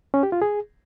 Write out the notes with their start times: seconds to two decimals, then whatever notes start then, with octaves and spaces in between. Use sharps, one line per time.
0.14 C#4
0.23 G4
0.32 F4
0.42 G#4